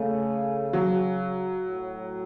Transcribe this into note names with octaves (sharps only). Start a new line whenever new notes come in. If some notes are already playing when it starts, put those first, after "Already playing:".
Already playing: C#3 A3
F#3
A2